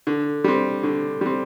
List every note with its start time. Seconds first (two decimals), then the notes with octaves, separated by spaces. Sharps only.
0.07 D3
0.44 G3 C4
0.83 D3
1.21 G3 C4